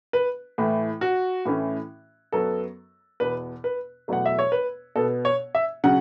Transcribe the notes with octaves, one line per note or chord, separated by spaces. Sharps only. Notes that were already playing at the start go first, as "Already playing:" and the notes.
B4
A2 E3 A3
F#4
A2 E3 A3 C#4
F#2 F#3 B3 A4
E2 B2 B3 B4
B4
E2 B2 F#3 A3 F#5
E5
C#5
B4
B2 B3 A4
C#5
E5
C#3 F#3 C#4 F#5